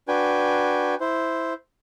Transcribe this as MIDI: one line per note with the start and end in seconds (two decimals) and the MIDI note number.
0.08 0.95 62
0.08 0.95 66
0.08 0.95 71
0.08 0.95 79
0.08 0.95 80
1.00 1.53 64
1.00 1.53 72